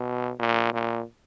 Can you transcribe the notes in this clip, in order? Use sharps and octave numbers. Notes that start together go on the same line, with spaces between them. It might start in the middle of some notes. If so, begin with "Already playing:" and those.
Already playing: B2
A#2
A#2